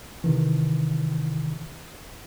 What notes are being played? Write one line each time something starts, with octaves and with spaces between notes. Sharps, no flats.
C3 D#3 E3